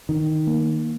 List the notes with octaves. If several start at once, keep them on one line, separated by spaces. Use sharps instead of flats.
D#3
A#3